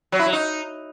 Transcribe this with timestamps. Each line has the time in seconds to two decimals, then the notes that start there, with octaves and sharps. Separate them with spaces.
0.12 F#3
0.19 E4
0.26 F#3
0.33 D#4